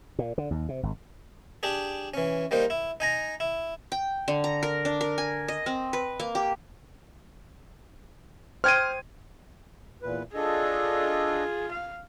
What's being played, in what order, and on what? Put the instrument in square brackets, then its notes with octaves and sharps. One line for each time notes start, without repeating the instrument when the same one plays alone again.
[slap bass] A#2
D3
D#2
C3
G#1
[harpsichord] D4 G4 G#4
E3 C#4
G3 A#3 D#4 C5
E4
D#4 G#5 A#5
E4
[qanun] G5
D3
A#5
A#4
D4
A#4
G#5
D#5
C4
B4
A#3
G4
[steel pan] C5 G5 D#6 [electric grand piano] F6 G#6 D#7
[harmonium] E2 A#2 B4
[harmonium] D4 A4 D#5 [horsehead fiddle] F4 G#4
[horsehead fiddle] F5